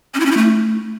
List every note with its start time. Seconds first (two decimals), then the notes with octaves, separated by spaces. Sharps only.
0.14 C#4
0.20 E4
0.26 C#4
0.31 E4
0.37 A3